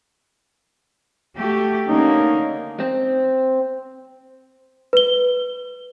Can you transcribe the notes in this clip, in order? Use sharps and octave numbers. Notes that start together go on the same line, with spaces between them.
A3 F#4 G4
D3 A#3 C#4 D#4
C4
B4 G7